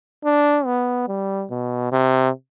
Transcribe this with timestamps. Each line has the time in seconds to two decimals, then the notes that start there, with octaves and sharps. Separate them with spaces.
0.25 D4
0.66 B3
1.08 G3
1.51 B2
1.92 C3